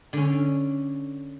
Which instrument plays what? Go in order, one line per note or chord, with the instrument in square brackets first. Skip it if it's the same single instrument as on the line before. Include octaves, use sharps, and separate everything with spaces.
[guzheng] D3 C#4